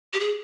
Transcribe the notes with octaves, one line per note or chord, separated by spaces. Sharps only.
G4
G#4